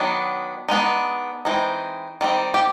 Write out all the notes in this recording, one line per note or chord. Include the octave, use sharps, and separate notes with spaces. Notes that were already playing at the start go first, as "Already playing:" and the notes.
Already playing: D#3 F#3 B3 D4
G#3 B3 D4 D#4
E3 G#3 C4 D#4
D#3 G3 C4
G4